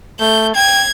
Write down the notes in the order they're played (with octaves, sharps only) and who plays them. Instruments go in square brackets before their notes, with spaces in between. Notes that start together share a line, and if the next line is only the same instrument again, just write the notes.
[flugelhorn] A3 [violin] G6
[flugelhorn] G5 [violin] G#6